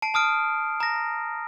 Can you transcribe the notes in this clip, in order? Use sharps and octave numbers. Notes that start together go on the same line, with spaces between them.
A5 C7 D7
A5 D#6 F6 D7
A#5 A#6